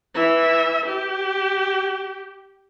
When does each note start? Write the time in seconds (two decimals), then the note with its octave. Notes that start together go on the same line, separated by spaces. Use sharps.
0.15 E3 E5
0.86 G4